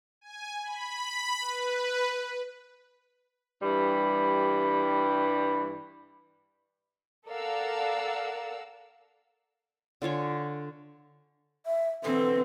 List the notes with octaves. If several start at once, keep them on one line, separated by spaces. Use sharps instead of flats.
G#5
B5
B4
G2 E3 G3 B5
A4 A#4 D5 F5 F#5 E6
D3 F4 C#5 G#5
E5
B2 D3 E3 C4 A4